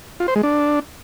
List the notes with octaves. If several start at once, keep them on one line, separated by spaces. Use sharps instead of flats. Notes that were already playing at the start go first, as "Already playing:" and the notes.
F4
C5
G#3
D4